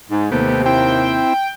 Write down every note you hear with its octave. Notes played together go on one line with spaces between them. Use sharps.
G#2
D#2 C3 A3 B3 G4
C4 E4 G5